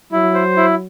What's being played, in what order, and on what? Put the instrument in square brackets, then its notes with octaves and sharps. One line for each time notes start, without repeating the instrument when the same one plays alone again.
[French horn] F#3 [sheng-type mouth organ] E4
[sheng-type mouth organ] C5
E4